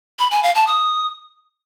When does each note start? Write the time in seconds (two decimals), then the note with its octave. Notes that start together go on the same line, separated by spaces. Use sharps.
0.19 B5
0.31 G#5
0.43 F5
0.55 A5
0.67 D#6